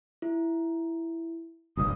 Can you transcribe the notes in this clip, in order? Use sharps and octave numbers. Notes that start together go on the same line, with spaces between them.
E4
F1 A#1 G2 D#6